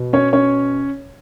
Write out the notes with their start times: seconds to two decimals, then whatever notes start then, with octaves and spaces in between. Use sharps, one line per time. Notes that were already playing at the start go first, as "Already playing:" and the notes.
Already playing: B2
0.13 C#4 C#5
0.33 C#4 C#5